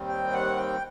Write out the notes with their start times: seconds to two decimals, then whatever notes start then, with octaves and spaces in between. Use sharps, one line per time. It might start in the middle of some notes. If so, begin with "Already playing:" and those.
Already playing: D#2 D#3 G3 C4
0.08 G5
0.33 F#5
0.57 G5